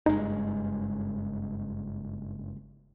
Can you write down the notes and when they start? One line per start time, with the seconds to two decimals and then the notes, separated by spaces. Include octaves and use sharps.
0.06 F#1 G2 G#3 D#4